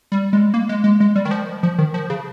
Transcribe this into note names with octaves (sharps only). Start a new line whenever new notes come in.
G3
G#3
A#3
G#3
G#3
G#3
G3
D#3
F3
F3
D#3
F3
C#3